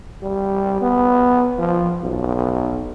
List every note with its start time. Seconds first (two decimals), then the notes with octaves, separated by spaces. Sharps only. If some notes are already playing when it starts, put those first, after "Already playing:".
0.22 G3
0.82 B3
1.58 F3
2.02 B1